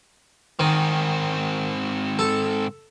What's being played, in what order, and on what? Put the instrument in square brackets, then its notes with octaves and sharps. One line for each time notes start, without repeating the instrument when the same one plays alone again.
[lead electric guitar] G#2 C4 [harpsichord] D#3
[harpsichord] A4